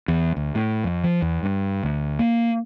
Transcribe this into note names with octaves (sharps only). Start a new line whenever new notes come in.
E2
D2
A2
F2
F3
E2
G2
D2
A#3